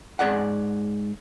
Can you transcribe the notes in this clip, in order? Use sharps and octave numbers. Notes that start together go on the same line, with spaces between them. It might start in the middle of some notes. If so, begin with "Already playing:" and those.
G#2 G#4 D5 F#5